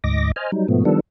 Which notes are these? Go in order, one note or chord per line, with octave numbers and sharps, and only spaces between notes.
D2 G#2 D#5 D6 A#6
C5 D#5 G#5 F6
F#3 G3 D#4
G#2 B2 F3 A3 B3
D#3 F3 G3 B3 D4 A4